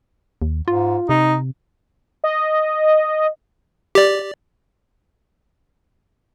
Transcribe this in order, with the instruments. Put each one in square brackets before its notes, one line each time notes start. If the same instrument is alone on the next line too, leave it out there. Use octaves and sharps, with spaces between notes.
[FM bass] D#2
[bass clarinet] G#2 [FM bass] F4
[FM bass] C3 [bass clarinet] D#4
[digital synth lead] D#5
[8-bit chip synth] G4 D5